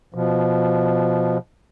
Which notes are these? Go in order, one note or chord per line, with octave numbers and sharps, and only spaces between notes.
B2 F3